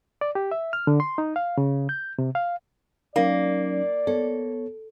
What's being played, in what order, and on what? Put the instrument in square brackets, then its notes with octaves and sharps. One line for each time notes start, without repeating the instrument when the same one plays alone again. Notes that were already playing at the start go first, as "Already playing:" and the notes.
[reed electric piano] D5
G4
E5
F6
D3
C6
D#4
F5
C#3
G6
C3
F5
[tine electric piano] F#3 C#4 D#4 [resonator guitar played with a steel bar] A#3 [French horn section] D5
[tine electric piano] B3 C#5 [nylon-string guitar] A4